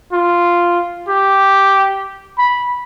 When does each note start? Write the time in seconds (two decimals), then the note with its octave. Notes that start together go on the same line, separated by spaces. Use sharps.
0.13 F4
1.08 G4
2.38 B5